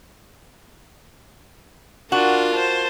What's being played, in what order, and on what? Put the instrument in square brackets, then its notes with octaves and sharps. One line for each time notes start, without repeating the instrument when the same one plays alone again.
[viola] D4 [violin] F4 A#4 [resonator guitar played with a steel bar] F#4
[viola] C5 A5